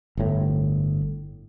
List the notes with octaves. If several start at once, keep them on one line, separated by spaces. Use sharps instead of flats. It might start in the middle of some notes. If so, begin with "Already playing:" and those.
G1 A2